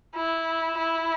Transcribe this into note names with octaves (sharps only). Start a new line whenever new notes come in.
E4
E4